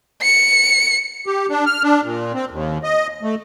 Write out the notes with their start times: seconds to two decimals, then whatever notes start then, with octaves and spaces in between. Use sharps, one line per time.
0.22 C#7
1.27 G4
1.50 D4
1.66 F6
1.83 D4
2.04 A#2
2.34 C4
2.51 D#2
2.84 D#5
3.23 A3